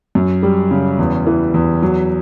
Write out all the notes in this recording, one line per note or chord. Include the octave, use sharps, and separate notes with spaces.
F#2
G3
C#3
E2
E3
E2
F#3